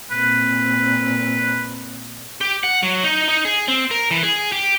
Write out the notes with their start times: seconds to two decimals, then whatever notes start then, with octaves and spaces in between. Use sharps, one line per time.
0.11 A#2 C4 B4
2.41 G4
2.63 F#5
2.83 F#3
3.04 D#4
3.29 D#4
3.45 G#4
3.68 C4
3.91 A#4
4.11 E3
4.23 G#4
4.52 G4